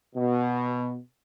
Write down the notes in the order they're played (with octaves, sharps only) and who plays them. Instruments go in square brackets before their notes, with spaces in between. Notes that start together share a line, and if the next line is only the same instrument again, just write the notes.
[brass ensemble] B2